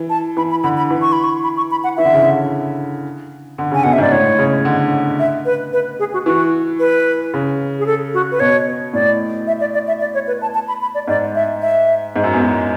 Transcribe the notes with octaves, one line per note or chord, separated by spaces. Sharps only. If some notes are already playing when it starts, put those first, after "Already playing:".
Already playing: E3
A5
E3 B5
B5
D3 B5
B5
E3
C#6
B5
C#6
B5
C#6
B5
F#5
E3 E5
D3
C#3
D3
D3
C#3 G#5
B2 F#5
E5
G#2 D5
A2 C#5
C#3
D3
E5
B4
B4
G#4
F#4
E3 F#4
B4
C#3
G#4
A4
F#4
B4
B2 C#5
A2 D5
E5
D5
D5
E5
D5
C#5
B4
A5
A5
B5
B5
D5
G#2 D5
E5
E5
G#2
F#2
E2
F#2